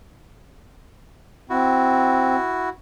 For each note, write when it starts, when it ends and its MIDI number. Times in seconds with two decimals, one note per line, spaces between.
1.50 2.36 60
1.50 2.69 64
1.50 2.69 66